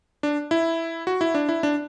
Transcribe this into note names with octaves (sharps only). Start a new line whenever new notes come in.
D4
E4
F#4
E4
D4
E4
D4